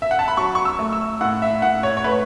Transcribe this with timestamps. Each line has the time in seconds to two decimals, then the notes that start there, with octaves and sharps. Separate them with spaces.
0.02 E5
0.11 F#5
0.19 A5
0.28 B5
0.37 F#3 C#6
0.55 C#6
0.65 E6
0.79 A3
0.93 E6
1.21 A2 F#5
1.42 E5
1.62 A2 F#5
1.83 C#5
1.97 C#5
2.04 A3 B4